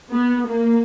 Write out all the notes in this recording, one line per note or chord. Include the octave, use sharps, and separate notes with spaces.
B3
A#3